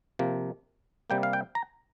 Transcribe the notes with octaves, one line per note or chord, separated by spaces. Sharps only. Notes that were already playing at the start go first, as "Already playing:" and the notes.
C3 F3 A#3
C3 G3 A#3 G5
F5
G5
A#5